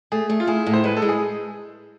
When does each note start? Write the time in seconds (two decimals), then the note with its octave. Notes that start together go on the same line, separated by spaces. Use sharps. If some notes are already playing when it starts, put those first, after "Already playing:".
0.12 A3 G#4
0.30 A3
0.40 F4
0.47 E4 G#4
0.66 A2
0.73 C5
0.84 G#3 B4
0.97 A4
1.02 G#3
1.09 G#4